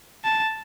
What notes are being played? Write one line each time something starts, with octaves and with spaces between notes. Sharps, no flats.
A5